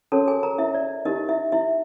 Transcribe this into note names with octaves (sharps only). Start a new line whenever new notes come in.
C#4 F#4 A4 A#4 C#5 A5
G#4 G#5
A#4 A#5
E4 E5
D5
D#4 E4 G4 A#4 D#5
E4 E5
E4 E5